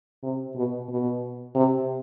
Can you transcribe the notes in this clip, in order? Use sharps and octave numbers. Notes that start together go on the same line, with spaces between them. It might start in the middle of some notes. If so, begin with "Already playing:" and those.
C3
B2
B2
C3